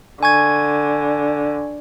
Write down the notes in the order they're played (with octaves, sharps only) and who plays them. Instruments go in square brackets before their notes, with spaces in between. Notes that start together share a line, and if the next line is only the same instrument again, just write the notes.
[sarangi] D3 [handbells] G#5 C#6 G#6